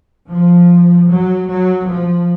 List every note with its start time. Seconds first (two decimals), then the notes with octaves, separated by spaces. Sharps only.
0.28 F3
1.08 F#3
1.47 F#3
1.87 F3